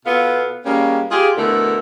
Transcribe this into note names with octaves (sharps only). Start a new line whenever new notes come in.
B2 B3 F4 A4 F5
G3 G#3 A#3 C#4
F4 G4 G#4
B2 D3 A3 E4 A#4